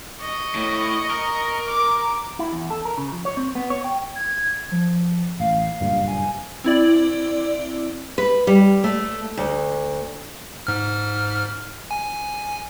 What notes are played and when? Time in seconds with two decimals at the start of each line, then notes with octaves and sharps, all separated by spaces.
0.21 D#5 C#6
0.55 A2
1.10 A#4
1.67 D6
2.39 E4
2.52 E2
2.70 A4
2.85 A#4
2.97 C#3
3.12 F3
3.25 C#5
3.37 C4
3.55 B3
3.70 C#5
3.84 G5
4.15 G#6
4.72 F3
5.40 A1 F5
5.81 F#1 G2 A#2
6.08 G#5
6.64 C4 E4 D5
8.18 B4
8.47 G3
8.84 A3
9.37 D2
10.67 G#2 F6
11.91 G#5